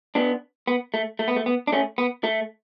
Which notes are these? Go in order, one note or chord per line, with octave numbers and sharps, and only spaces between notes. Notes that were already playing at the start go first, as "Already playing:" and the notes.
B3 D4
B3
A3
A3
B3
A3
B3
D4
A3 C#4
B3
A3